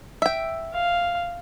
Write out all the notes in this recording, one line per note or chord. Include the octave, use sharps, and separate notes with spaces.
E5 G5
F5